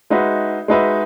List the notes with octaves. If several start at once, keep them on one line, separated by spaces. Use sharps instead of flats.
G#3 D#4 F#4 B4 E5
G#3 D#4 F#4 B4 E5